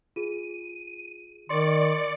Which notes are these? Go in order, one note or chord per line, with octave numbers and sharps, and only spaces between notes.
F4 G#4 D#7
D#3 D5 C6 C#6 C#7